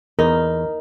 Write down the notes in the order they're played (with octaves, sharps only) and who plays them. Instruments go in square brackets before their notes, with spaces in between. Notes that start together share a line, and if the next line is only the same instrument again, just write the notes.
[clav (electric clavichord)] E2 [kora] D#4 [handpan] A#4